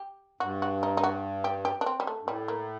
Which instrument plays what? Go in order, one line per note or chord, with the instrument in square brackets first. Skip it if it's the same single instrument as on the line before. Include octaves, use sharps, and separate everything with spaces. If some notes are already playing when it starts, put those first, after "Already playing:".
Already playing: [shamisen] G4
[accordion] G2 [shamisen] F#4
[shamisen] F#4
D#4
D#4
F#4
G4
G4
D4
C4
G3
A3
[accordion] G2
[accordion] A2 [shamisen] G3
[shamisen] A#3